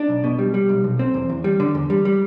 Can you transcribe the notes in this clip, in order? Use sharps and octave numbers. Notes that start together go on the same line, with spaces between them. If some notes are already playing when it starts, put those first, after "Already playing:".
Already playing: D4
B1
B2
G3
G3
B1
B1
C4
E2
E2
G3
D3
E2
G3
G3